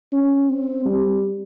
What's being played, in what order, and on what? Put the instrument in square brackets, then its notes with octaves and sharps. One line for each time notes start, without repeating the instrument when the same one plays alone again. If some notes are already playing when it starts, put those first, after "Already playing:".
[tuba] C#4
C4
G3